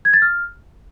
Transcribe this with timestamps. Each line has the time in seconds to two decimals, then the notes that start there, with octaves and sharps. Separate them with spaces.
0.05 G#6
0.13 A6
0.22 F6